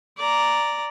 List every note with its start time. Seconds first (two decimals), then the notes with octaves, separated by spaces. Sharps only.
0.17 D5 A#5